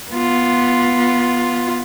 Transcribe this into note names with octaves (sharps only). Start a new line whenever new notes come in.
B3 F4